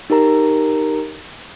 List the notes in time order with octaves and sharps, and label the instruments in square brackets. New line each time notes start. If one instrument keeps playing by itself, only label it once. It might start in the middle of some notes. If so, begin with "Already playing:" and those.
[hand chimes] D#4 G4 A#4 A#5